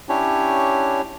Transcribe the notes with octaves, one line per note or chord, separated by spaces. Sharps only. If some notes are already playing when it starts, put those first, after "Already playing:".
C#4 D4 E4 G4 C#5